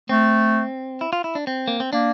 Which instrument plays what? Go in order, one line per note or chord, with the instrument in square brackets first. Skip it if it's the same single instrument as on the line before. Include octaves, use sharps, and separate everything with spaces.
[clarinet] A3 [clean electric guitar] C4
[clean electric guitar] E4
F4
E4
D4
C4
A#3
C4
[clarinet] A#3 [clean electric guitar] D4